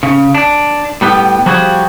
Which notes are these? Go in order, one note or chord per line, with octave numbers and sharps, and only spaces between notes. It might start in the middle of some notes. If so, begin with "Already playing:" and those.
C#3
D4
A2 G3 B3
F3 G3 F#4 G#4